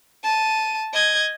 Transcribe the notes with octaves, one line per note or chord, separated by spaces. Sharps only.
A5 D#7
D#5 G#6